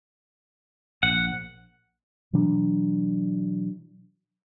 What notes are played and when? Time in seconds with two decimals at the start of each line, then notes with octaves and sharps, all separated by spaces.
1.03 A#1 F#5
2.33 B2 E3 F#3 D4